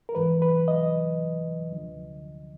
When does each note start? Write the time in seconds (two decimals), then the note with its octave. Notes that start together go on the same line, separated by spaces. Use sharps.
0.09 A#4
0.15 G#2 E3 B4
0.42 B4
0.68 D#5
1.71 D2 D3 F3